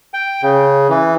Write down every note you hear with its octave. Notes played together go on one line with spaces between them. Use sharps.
G5
C#3
E3